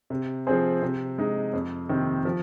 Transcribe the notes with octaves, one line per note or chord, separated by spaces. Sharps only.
C3
F3 C4 G#4 C5
C3
G#3 D#4
F2
C3 D#3 C4
F3